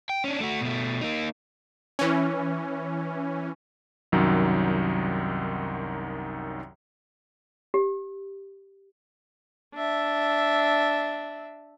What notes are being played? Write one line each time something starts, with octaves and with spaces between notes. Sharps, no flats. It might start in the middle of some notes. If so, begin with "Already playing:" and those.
G5
C#4 D4
A3 F#4
B2 A3
A#3 D#4
E3 C#4
C2 F#2 D#3 F#3
G4
D4 E5